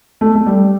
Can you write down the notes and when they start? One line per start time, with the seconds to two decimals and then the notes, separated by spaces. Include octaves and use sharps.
0.21 A3
0.35 A3
0.46 G3